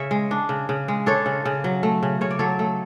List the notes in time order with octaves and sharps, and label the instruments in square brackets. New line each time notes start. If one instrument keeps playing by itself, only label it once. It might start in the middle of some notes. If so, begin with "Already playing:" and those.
Already playing: [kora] C#3 C#5 E5
G#3
D4
C#3
C#3
G#3
D4 A4 C#5
C#3
C#3
F#3
A3
C#3
C#3 C#5
D5
F#3 A4 C#5
A3